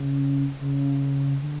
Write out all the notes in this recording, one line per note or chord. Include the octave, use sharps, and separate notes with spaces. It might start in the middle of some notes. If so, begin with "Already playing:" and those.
Already playing: C#3
C#3
D3